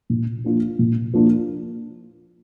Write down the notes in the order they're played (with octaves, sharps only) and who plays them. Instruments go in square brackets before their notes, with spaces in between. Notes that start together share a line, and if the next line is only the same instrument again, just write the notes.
[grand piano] A#2
F3 A#3 D4 F4
A#2
F3 A#3 D4 F4